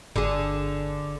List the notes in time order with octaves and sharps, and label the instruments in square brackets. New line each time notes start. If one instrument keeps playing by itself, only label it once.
[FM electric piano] G1 [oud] D3 G#4